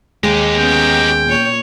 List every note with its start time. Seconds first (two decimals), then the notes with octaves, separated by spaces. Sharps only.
0.24 D#2 G#3 D#4 G4
0.57 B3 C#4 G5
1.25 A#2 C#5